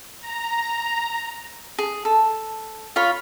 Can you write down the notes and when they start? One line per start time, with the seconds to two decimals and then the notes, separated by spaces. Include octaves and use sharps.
0.21 A#5
1.78 G#4
2.05 A4
2.96 F4 C#5 F5 B5